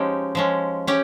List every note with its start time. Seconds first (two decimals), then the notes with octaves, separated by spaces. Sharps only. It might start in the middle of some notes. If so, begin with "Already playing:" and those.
Already playing: F3 G#3 C#4 D#4 G4
0.35 F3 G#3 C#4
0.87 C#4 G4